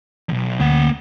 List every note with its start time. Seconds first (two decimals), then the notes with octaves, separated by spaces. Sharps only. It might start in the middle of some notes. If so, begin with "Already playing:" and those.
0.29 B1 E2
0.60 D2 A#3 F#5